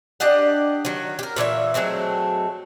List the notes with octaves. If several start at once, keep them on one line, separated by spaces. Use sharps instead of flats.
D4 G4 D#5 F#5
D#3 F#3
G4 A#4
A#2 E3 C#5 E5
F#3 G#3 A3 C4